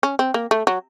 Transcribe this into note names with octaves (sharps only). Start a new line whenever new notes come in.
C#4
C4
A#3
A3
F#3